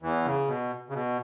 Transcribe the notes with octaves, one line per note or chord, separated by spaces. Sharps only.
E2 E3
C#3
B2
C#3
B2